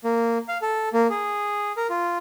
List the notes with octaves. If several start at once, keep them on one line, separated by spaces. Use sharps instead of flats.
A#3
F5
A4
A#3
G#4
A#4
F4